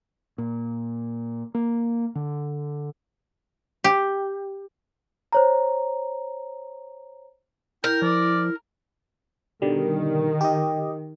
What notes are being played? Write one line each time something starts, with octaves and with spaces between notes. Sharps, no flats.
A#2
A#3
D3
G4
C5 C#5 A#5
E4 A#4 G5
F3 D5
B2 D3 D#3 G3
G4 D#5